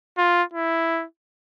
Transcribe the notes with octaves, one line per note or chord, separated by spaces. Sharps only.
F4
E4